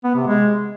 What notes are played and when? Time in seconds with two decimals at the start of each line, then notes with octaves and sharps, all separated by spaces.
0.04 B3
0.15 C3
0.27 G#3